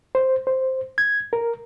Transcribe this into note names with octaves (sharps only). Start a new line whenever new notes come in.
C5
C5
G#6
A#4